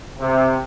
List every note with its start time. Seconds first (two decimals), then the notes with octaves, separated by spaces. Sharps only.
0.20 C3